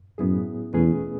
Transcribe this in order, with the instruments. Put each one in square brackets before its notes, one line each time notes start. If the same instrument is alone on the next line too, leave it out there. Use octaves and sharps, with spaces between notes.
[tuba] F#2 [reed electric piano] A2 F#3 B3 E4 G#4
[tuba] E2 [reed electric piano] B2 A3 C#4 G#4 B4